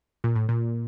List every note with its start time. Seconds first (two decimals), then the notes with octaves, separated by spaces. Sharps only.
0.24 A#2
0.36 A2
0.49 A#2